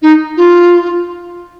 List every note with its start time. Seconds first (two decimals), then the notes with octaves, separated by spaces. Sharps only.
0.02 D#4
0.37 F4